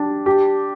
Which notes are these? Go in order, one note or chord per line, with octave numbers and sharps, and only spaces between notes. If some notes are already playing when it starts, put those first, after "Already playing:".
Already playing: D4 G4
G4